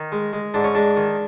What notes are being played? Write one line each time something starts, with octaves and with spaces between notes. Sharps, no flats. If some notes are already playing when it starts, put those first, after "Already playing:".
Already playing: D#3
G#3
G#3
G#2 D4
C#4
G#3 D4
D#3